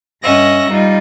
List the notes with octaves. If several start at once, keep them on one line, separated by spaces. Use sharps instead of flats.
G2 C#4 D#5 E5 F#5 A#6
G3 D#4 F4